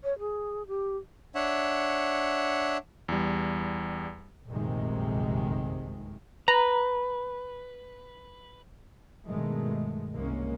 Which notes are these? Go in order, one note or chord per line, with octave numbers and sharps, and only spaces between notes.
C#5
G#4
G4
D4 C#5 E5 F#5
E2 G3
F1 A#1 F#2 C3 D#3 G#3
B4 A#5
G2 B2 D#3 G#3 A3
C2 G#3 A#3 C#4